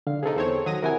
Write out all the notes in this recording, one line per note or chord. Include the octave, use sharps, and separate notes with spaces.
D3 F5
C3 D#3 G#4 A4
E2 C4 C#5
D#3 F#3 D#6 A#6
C3 E3 A#4 F#5 G#5